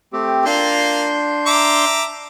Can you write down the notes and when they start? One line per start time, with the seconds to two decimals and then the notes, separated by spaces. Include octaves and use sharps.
0.13 A3 C4 G4
0.46 A#3 D4 F4 C6 G6
1.47 E5 A#5 D6